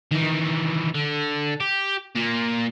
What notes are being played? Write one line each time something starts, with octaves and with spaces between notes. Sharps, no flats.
D#3 E3
D3
G4
A#2 A#3